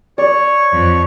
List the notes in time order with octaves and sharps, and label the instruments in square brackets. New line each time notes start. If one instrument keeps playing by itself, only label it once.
[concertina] C#5 [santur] D5
[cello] F2